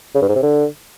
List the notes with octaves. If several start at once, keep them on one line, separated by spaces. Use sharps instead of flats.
C#3
G2
G#2
C3
D3